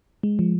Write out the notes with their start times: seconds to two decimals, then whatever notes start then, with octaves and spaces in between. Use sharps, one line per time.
0.23 G#3
0.39 F3